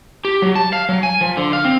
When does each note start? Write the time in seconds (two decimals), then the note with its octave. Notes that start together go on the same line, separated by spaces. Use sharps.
0.25 G4
0.42 F#3
0.55 A5
0.73 F5
0.89 F#3
1.03 G#5
1.21 F3
1.37 D3
1.53 F5
1.65 C4